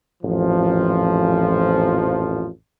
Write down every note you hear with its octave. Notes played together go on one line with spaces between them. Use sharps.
A1 F2 A#2 F3